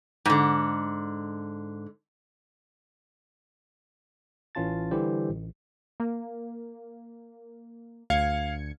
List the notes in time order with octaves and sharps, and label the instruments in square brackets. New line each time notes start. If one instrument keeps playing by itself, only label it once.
[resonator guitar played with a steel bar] G#2 D3
[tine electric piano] A1 E3 C#4 F4 A5 A6
D3 E3 G3 E4 G4 C5
A1
[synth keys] A#3
[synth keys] D2 G#6 C#7 [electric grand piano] F5